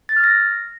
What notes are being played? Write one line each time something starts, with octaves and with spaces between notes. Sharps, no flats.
A6
F6
A#6